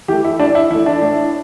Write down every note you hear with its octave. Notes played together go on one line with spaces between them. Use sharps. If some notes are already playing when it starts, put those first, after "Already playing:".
E3 A3 G4
E4
A2 D4
E4
E3 A3 E4
D4
A2